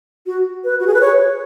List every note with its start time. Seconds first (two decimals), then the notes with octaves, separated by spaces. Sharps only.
0.26 F#4
0.64 B4
0.80 F#4
0.87 G#4
0.94 B4
1.01 C#5